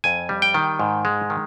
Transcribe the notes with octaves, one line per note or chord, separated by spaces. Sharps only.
F2 G#5
G3
G5
D#3
G#2
G#3
D#3